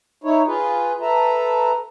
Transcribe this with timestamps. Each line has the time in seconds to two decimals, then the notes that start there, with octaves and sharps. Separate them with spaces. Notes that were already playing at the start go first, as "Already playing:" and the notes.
0.24 D#4 E4 C#5
0.47 F4 G#4 B4
1.01 A4 B4 E5 A#5